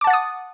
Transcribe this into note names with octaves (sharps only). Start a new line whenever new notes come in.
F#5 A5 D6 D#6 A6